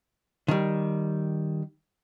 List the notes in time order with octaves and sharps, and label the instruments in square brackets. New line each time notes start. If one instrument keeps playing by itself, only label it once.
[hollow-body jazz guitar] D#3 G3